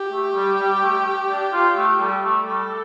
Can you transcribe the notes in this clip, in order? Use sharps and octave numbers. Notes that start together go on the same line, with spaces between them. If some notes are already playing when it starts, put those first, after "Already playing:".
Already playing: G4
A3
G3
G3
A3
D4
F4
A3
G3 A4
A3
G3 A4